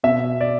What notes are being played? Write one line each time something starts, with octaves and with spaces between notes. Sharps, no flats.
B2 E5
D5